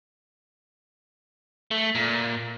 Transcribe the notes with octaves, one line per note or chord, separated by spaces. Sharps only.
A3
A#2